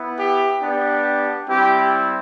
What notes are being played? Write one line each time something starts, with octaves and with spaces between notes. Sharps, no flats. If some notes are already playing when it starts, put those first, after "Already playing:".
Already playing: B3 E4
G4
B3 D4 G4
G3 C4 E4 G4